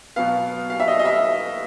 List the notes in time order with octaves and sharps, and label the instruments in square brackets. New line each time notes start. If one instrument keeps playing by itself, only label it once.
[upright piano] B2 F#3 B3 F5
F5
E5
D#5
D#5
E5